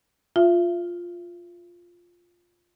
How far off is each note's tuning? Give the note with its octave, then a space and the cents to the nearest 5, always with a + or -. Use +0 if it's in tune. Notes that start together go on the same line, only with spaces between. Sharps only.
F4 +5 E5 +35